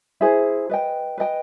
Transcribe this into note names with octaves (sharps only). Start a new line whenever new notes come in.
E4 G#4 C5
B4 D#5 G5
B4 D#5 G5